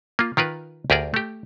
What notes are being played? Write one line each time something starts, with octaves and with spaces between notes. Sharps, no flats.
A#3 F4
D#3 F4 A#4 B4
D2 G4 G#4 A#4 D5
A3 G4